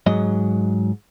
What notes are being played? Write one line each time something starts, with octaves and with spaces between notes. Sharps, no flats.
G#2 F#3 D#5